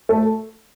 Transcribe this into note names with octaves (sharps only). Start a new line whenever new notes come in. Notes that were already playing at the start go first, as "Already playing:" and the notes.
A3